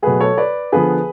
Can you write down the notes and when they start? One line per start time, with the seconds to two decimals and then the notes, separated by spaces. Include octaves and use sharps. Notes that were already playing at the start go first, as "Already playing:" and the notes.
0.02 B2 F#3 A3 G#4 B4
0.20 A4 C#5
0.37 B4 D5
0.72 D3 F3 B3 G#4 B4